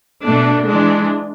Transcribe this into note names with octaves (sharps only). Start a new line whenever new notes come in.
B2 A3 D4
E3 G#3 D4